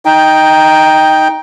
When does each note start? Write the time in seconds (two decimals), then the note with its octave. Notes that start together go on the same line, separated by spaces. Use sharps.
0.05 D#4 G5